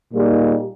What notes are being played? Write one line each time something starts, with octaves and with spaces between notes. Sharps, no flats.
A#2 G3 A#3 D#4 G#4